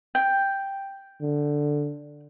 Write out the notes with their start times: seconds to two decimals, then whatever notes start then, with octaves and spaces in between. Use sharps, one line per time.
0.15 G5
1.22 D3